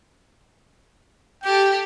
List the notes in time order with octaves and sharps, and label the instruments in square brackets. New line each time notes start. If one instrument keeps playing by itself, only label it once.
[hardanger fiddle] G4 A4 [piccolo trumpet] G5